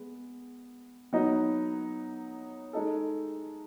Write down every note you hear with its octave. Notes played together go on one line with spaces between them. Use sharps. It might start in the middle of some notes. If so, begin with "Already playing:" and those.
Already playing: G#3 B3
F#3 B3 D#4
G#3 D#4 A4